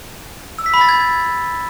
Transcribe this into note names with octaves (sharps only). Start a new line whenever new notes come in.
E6
B6
B5
A6
G#6